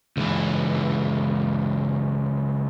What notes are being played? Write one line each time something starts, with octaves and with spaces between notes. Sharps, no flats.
C#2 E3